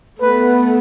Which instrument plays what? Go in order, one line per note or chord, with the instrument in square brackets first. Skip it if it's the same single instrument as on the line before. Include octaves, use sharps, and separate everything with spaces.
[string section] A3 B3 [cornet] B4